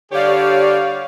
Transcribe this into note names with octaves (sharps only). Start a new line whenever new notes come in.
D3 G3 G4 C#5 D5 F5